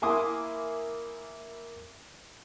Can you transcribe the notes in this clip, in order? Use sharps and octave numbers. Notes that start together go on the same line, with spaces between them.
A#3 E4 G#5 C6 D6 D#6